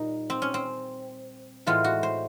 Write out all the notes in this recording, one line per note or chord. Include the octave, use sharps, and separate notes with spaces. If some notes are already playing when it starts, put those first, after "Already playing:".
Already playing: A#2 G3 D#4
C4
C#4
C4
A2 E3 G#3 B3 F4
F#4
C5